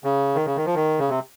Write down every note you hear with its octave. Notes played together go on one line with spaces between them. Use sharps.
C#3
D#3
C#3
D#3
F3
D#3
C#3
C3